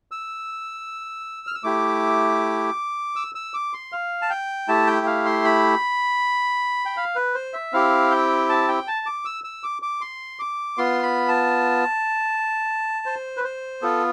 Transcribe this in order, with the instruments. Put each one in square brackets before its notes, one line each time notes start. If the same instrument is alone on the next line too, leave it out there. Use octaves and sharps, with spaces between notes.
[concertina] E6
F6
E6
A3 E4 G4 D6
E6
E6
D6
C6
F5
A5
G5
A3 E4 G4 A5
G5
F5
C6
B5
G5
F5
B4
C5
E5
C4 E4 G4 F5
G5
A5
G5
A5
D6
E6
E6
D6
D6
C6
D6
B3 F4 C6
B5
A5
C5
B4
C5
B3 F4 A4